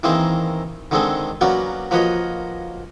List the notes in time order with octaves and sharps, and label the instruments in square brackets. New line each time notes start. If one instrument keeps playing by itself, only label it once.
[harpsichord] D#3 E3 A#3 C4 G#4 C5
D3 D#3 G#3 C4 G#4 A4
F#3 A#3 B3 C#4 F#4 D5
F3 A#3 F#4 B4 C#5 D#5